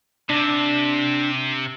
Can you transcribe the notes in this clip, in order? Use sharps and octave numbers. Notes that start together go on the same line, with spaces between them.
C3 D4